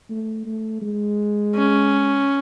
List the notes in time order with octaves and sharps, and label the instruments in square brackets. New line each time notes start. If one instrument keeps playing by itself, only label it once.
[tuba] A3
A3
G#3
[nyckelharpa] C#4